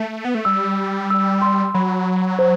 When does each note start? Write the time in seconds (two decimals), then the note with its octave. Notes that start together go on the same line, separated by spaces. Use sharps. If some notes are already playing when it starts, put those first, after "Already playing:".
Already playing: A3
0.25 B3
0.35 A3
0.45 G3 E6
1.10 E6
1.42 C6
1.74 F#3 B5
2.39 C5